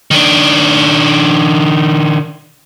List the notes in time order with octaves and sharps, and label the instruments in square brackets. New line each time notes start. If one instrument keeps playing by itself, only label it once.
[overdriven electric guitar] D#3 D4